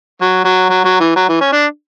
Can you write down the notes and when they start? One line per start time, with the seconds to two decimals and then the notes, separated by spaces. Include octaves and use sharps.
0.21 F#3
0.44 F#3
0.69 F#3
0.84 F#3
1.00 E3
1.16 F#3
1.29 E3
1.41 C#4
1.52 D4